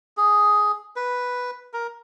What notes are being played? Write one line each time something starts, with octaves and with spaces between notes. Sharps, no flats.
G#4
B4
A#4